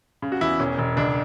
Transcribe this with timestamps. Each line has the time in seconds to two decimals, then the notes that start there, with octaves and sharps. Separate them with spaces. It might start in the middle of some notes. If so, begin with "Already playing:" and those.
0.22 C#3
0.32 F#4
0.41 E2 E4
0.60 E1 C#4
0.78 E1
0.97 C#2 D4